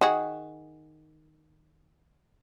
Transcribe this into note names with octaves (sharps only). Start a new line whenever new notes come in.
D#3 F#4 G#4